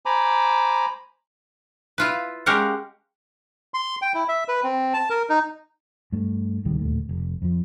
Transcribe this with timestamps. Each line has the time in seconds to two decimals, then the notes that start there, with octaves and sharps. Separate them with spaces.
0.06 C5 G#5 A#5 B5 D6
1.98 E4 F4 B4
2.46 G#3 C#4 G4 A#4 F5 F#5
3.74 C6
4.02 G5
4.15 E4
4.28 E5
4.48 B4
4.63 C4
4.94 A5
5.10 A#4
5.30 D#4
6.12 G2 A3
6.65 D1 C2 D#3 G3
6.81 D1 D#2 A#2 A3
7.09 F1
7.42 F2 F3